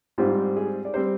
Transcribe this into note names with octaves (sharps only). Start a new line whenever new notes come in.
G#2 G3 C4 F4
G#4
D5
G3 C4 C5